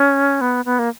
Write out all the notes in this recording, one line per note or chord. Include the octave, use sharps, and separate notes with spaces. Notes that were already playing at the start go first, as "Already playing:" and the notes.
Already playing: C#4
B3
B3
A#3